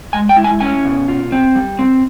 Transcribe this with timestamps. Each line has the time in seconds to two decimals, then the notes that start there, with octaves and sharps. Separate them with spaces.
0.13 G#3 G#5
0.29 G5
0.37 E4
0.44 G#5
0.60 C#4 G#5
0.85 B2
1.08 F4
1.32 C4
1.55 G3
1.79 C4